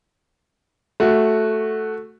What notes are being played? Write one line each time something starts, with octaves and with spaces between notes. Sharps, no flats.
A3 F#4